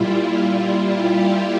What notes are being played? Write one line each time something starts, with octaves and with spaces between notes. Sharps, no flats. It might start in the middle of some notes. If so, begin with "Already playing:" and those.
Already playing: A#2 G3 E4 F4
G4